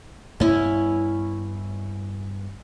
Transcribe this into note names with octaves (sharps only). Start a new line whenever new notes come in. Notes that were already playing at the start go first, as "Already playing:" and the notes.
G2 B3 C#4 E4